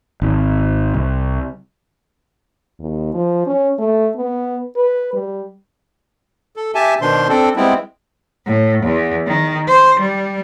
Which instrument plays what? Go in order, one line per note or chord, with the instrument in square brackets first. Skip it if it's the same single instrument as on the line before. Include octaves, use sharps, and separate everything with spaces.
[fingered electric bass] G#1
C2
[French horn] D#2
F3
C#4
A3
B3
B4
G3
[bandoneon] A4
G4 E5 G#5 A5
B2 D#3 D4 C5 C6
C4 D4 A4
G3 G#3 B3 C4 E4
[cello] A2
E2
D#3
C5
G3